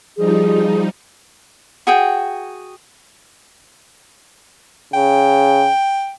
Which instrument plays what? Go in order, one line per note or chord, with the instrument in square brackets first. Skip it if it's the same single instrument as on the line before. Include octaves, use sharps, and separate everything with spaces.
[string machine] F3 G3 D#4 [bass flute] G#4
[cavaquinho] F#4 G#4 G5
[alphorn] C#3 [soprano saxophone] G5